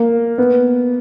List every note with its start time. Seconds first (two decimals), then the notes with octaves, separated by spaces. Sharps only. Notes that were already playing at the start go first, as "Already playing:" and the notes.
Already playing: A#3
0.38 B3